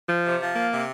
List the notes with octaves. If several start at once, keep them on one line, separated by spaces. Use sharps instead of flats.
F3
C3
F3
A#3
C3